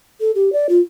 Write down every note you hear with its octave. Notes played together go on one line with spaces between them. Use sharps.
A4
G4
D5
F4